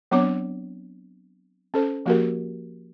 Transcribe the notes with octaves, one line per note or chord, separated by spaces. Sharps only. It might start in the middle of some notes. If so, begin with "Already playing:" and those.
F#3 B3 C4 D4 C#5 D6
C#4 A4 C5
F3 A#3 F#4 G4 A#4